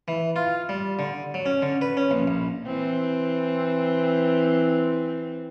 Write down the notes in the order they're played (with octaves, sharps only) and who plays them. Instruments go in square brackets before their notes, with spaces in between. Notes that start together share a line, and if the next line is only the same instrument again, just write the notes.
[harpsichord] E3
F4
G3
D3
F#3
C#4
D3
B4
C#4
A#1
A#1
[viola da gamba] E3 C4